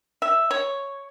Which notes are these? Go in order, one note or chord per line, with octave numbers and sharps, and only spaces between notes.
E5
C#5